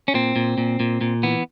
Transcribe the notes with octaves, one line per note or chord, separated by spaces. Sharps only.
C#4
A#2 C4
A#2
A#2
A#2
A#2
E3 B3